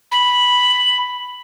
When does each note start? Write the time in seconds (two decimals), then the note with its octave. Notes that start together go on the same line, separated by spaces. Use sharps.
0.11 B5